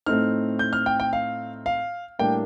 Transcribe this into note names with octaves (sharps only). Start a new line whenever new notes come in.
A2 A3 C4 D#4 F6
G6
F6
G5
G5
F5
F5
A2 G3 A#3 D4 G5